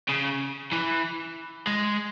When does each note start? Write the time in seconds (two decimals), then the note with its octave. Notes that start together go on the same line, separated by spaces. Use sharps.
0.09 C#3
0.72 E3
1.67 G#3